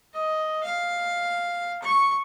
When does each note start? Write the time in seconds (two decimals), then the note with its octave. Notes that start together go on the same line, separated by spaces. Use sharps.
0.13 D#5
0.63 F5
1.83 C#6